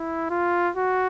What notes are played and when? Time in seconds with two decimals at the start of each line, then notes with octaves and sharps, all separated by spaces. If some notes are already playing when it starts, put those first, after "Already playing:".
Already playing: E4
0.30 F4
0.76 F#4